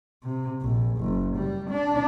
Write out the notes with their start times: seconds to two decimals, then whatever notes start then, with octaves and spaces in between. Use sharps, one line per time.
0.23 C3
0.62 A#1
0.98 F#1
1.36 G3
1.70 D4